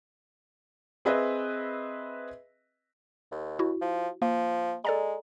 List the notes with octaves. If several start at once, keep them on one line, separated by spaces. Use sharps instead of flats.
C4 G#4 B4 D#5 E5
D#2
E4 F#4
F3
F3 A#3
G#3 A4 D5 A#5